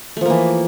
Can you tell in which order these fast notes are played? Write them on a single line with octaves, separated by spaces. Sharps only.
A3 F3 A#3 E3